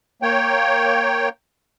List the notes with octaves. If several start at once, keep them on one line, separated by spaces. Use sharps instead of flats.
A#3 C#5 G5